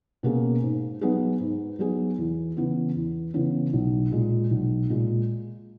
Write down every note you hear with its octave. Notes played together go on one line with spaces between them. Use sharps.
B2 A#3 C#4 G#4
G#2
F#3 B3 D#4 G#4
G#2
F#3 B3 D#4 G#4
E2
C#3 E3 B3
E2
C#3 E3 B3
B1
A#2 G#3
B1
A#2 G#3